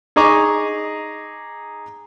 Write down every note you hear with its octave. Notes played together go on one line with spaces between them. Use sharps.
D#4 G#4 D#5 A#5 C#6 D6